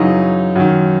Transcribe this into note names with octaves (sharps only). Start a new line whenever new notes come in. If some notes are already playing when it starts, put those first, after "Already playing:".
Already playing: F#2 C#3 E3 D#4
F#2 D#3